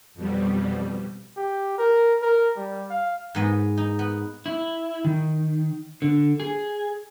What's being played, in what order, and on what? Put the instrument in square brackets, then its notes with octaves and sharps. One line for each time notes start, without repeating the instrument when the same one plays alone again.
[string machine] F2 B2 G3
[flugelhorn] G4
A#4
A#4
G3
F5
[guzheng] G#2 B3 D#5
D#4
B3
[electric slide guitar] E4
D#3
D3
G#4